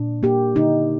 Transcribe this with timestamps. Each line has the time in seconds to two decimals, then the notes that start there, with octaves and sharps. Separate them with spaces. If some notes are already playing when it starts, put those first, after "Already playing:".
Already playing: A#2 D4
0.23 A#3 G4
0.55 D3 D#4